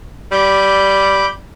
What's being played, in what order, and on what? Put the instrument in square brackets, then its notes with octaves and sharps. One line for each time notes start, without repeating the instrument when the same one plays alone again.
[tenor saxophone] G3 [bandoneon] B5 D6 G6